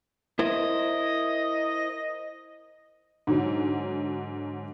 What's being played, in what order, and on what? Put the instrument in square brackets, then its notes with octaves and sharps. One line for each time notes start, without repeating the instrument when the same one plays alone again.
[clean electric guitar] E4 A#4 C5 [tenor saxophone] D#5
[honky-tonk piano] G#2 D3 F#3